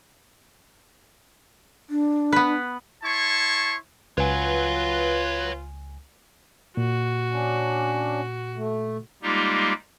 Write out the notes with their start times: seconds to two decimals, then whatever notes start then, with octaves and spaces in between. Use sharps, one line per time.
1.90 D4
2.32 B3 B4
3.03 E4 C#5 A5 C6 C#6
4.18 C#2 F4 B4 C#5 F#5 G#5
6.77 A#2 F#4
7.31 C#4 D4
8.55 A3
9.23 G3 G#3 A#3 D#4 F4 G4